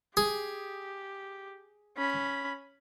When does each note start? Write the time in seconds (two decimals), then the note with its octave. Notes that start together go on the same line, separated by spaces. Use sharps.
0.17 G4 G#4
1.98 C#4 B5